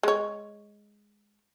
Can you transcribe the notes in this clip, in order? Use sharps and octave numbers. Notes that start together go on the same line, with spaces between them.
G#3 C#5